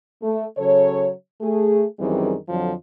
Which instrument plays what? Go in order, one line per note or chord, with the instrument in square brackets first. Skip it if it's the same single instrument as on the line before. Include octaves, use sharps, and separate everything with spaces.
[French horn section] A3
C#3 F#3 A4 C#5
A3 G#4
F#2 D#3 E3 G3 C4 G#4
F2 D3 F3 F#3